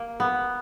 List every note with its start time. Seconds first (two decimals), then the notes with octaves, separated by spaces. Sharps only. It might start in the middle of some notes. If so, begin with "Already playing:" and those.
Already playing: A#3
0.20 B3